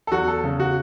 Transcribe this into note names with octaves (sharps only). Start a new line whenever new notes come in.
A4
E2 F#4
A4
C#3
F#4